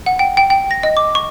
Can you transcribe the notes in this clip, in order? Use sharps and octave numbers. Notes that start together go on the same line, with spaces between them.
F#5
G5
G5
G5
A#6
D#5
D6
C#6